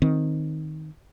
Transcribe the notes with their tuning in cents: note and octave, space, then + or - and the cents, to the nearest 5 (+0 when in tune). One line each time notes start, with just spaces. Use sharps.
D#3 +0 C4 +0